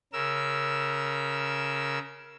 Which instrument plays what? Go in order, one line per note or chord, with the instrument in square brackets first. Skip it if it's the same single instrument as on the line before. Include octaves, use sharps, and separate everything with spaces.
[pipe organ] C#3 A#4 E6